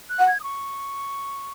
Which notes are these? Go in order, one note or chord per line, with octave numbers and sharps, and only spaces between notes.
F#6
F#5
G#6
D#6
C#6